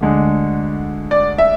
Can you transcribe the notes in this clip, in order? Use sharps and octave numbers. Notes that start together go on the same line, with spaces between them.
D2 D3 G#3
D5
E5